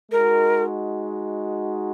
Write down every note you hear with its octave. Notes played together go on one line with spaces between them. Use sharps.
G#3 D#4 F#4 A#4